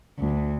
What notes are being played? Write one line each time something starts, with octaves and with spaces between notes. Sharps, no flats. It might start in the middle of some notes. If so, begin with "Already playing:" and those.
D2